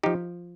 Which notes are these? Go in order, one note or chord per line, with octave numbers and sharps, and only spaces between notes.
F3 D#4 G4